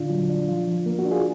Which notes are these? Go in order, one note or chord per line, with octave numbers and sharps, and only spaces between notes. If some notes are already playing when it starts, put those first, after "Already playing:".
Already playing: A#2 D3 D4 F4
F#3
D4
F3 F4
F3
A#3
F#4
D4
F4 G#4